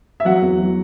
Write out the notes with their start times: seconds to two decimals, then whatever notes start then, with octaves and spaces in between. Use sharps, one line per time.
0.20 E5
0.25 F#3 F#5
0.42 E2
0.59 F#3